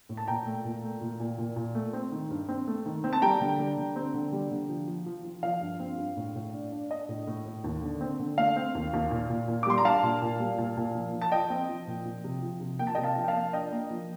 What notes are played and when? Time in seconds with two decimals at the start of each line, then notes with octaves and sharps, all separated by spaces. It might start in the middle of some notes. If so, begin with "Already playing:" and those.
0.09 A2
0.17 A5
0.27 A#2 G5 A#5
0.46 A3
0.65 A#2
0.83 A3
1.01 A#2
1.20 A#2
1.38 A#2
1.56 A#2
1.75 A3
1.93 C4
2.12 D#3
2.30 G2
2.49 C4
2.67 A3
2.86 D#3
3.04 C4
3.13 A5
3.22 G3 G5 A#5
3.41 D3
3.59 G3
3.77 D3
3.96 C4
4.14 D3
4.33 G3
4.51 D3
4.69 F3
4.88 F3
5.06 F3
5.25 F3
5.43 F3 F5
5.61 G2
5.80 C4
5.98 G2
6.17 A2
6.35 A2
6.54 D4
6.72 D4
6.90 D4 D#5
7.09 A2
7.27 A2
7.46 A2
7.64 D#2
7.82 D3
8.01 C4
8.19 D3
8.38 A3 F5
8.56 C4
8.75 D#2
8.93 D#2
9.11 A#2
9.30 A#2
9.48 A#2
9.63 D6
9.67 G3 C6
9.78 A#5
9.85 D4 F5 A5
10.03 A#2
10.22 A#2
10.40 G3
10.58 A#2
10.77 A#2
10.95 F3
11.14 F3
11.22 A5
11.32 F3 D#5 G5
11.50 C4
11.69 F3
11.87 A#2
12.05 F3
12.24 C3
12.42 F3
12.60 C3
12.79 A#3 G5
12.87 A5
12.95 C3 D#5 G5
13.04 F5 A5
13.16 F3
13.24 G5
13.28 F5 A5
13.35 A#3
13.53 D4 D#5 G5
13.71 A#3
13.90 F3